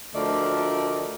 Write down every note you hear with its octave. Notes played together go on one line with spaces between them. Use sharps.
D2 F3 A3 A#4 D5 D#5